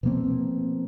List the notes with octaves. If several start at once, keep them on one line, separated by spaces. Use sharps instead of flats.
B2 F3 A#3 C4